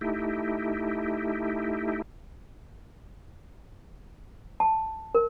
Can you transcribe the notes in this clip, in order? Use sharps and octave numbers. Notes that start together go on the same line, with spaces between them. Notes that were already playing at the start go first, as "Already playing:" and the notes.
A3 D#4 E4 G4
A5
A#4